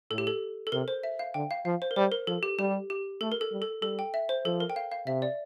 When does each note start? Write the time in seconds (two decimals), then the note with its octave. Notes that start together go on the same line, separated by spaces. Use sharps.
0.11 A2 A4
0.18 G4
0.27 A4
0.67 A4
0.72 C3 A#4
0.88 C5
1.03 E5
1.19 F5
1.34 D3 G5
1.51 F5
1.65 F3 F5
1.82 C5
1.91 A#4
1.96 G3 C5
2.12 A#4
2.27 F3 A4
2.43 G4
2.59 G3 G4
2.90 G4
3.21 A3 A4
3.32 A#4
3.41 A4
3.52 G3
3.62 A4
3.82 G3 A4
3.99 G5
4.14 E5
4.29 C5
4.45 F3 A4
4.60 A#4
4.70 G5
4.76 F5
4.92 F5
5.06 C3 E5
5.22 D5